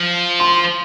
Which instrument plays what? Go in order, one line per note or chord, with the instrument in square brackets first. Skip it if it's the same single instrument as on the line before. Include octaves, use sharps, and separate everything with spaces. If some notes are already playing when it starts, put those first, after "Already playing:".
Already playing: [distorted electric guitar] F3
[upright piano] C6